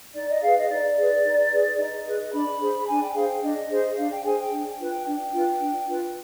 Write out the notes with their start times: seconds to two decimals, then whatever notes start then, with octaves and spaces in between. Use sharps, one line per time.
0.15 D#4 D5
0.28 D#5
0.42 G#4 B4 F5
0.56 D#5
0.69 D#4 D5
0.97 G#4 B4
1.24 D#4
1.51 G#4 B4
1.78 D#4 D#5
2.06 G#4 B4
2.33 D4 B5
2.60 G#4 C5
2.87 D4 G#5
3.01 G5
3.15 G#4 C5 F5
3.28 G5
3.42 D4 D#5
3.70 G#4 C5
3.97 D4 F5
4.10 G5
4.24 G#4 C5 G#5
4.38 G5
4.51 D4
4.70 G5
4.79 F4 B4
4.87 G5
5.06 D4 G5
5.33 F4 B4
5.61 D4
5.88 F4 B4